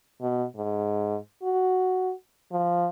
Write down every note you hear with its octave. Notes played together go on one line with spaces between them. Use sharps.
B2
G#2
F#4
F3